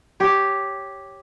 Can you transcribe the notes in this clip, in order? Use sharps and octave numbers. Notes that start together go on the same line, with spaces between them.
G4 C#5